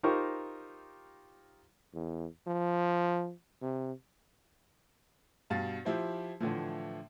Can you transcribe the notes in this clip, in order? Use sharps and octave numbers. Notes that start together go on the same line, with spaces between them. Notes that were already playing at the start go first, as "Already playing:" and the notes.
D#4 F4 G4 A#4 C5 C#6
E2
F3
C3
G2 B2 F5 A6
F3 E4 G4 C5
A2 D3 E3 F3